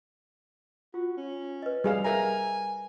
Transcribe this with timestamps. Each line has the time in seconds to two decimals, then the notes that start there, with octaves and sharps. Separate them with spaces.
0.94 F4 F#4
1.17 C#4
1.62 B4 D#5
1.84 G3 G#4 F5
2.04 A#4 E5 G#5 A#5